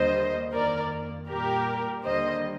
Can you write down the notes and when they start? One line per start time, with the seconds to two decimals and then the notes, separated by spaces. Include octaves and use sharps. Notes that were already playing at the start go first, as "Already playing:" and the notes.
Already playing: D#2 D3 G3 A#3 C5 D#5
0.53 F2 D#3 A#3 A#4 D5
1.28 A#2 G3 A#3 G4 A#4
2.03 D#2 D3 G3 A#3 C5 D#5